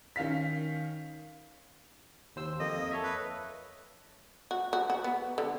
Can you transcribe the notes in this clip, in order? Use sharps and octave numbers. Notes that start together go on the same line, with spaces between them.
D#3 C#4 F5 B6
D#2 C5 E6
F2 A#3 D#5
A4 C#5 E5
B4
F#4
F#4
F#4
B3
D3